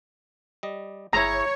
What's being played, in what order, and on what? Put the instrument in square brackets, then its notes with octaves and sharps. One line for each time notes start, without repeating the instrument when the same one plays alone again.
[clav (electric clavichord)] G3 D#5
[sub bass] G1 [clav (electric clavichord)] E4 G#4 [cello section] C#5 [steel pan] A#5